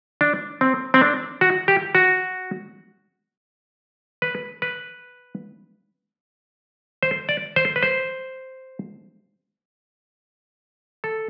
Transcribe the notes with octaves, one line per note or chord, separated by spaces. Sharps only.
D4
C4
C4
D4
F#4
G4
F#4
B4
B4
C5
D5
C5
B4
C5
A4